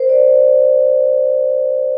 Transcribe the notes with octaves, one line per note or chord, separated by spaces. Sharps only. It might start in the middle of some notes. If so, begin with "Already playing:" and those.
Already playing: A#4 C5
D5